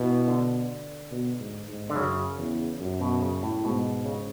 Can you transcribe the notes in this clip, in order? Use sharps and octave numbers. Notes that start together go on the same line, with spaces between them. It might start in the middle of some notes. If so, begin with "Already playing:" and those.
Already playing: B2 E3
D3
B2
G#2
G#2
D3
F#2 C#3
E2
F#2
B2
C#3
A2
G#2 B2
C#3